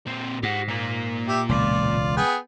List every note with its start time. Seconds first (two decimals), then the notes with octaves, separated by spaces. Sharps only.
0.07 A#2 C4
0.43 G#2 G4 F#5
0.68 A#2 A#3
1.28 G4 E5
1.49 E1 C#2 F4 D5
2.17 B3 G#4 G5